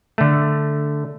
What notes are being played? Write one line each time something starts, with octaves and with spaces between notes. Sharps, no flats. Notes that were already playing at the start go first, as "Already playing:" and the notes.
D3 A3